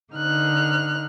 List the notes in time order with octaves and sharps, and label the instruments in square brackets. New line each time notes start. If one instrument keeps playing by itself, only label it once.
[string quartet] D3 D#4 F6 F#6